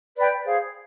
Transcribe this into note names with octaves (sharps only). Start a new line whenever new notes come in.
B4 D5 G5
G#4 C5 F5